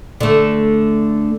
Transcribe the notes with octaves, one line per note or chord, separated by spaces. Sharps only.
D3 A3